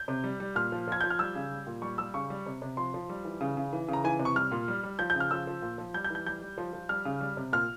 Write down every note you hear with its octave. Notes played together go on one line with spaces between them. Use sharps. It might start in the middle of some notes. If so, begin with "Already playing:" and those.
Already playing: G6
C3
G3
G3
A#2 F6
F3
F3 G#6
F3 G6
F6
G3 E6
C#3
G3
A#2
G3 C#6
G3 E6
C#3 C#6
G3
C3
C3
F3 C6
F3
G3
E3
C#3
C#3
E3
C#3 A#5
E3 G#5
C3
C#6
G3 F6
A#2
G3
G3
F3 G6
G6
C#3
F6
F3 E6
F3
A#2
F3
G3 G6
G6
E3
G6
G3 G6
G3
F3
F3
G3 F6
C#3
G3
C3
A#2 F6